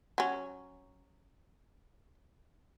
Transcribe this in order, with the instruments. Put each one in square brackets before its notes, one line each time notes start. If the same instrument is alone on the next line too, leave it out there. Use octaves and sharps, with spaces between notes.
[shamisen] F#3 C#4